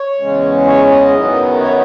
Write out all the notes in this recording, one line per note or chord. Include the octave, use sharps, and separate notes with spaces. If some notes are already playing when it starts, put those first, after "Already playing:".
Already playing: C#5
E2 C#3 G#3 C#4
C#5
D#5
F#2 D#3 F#3 B3
C#5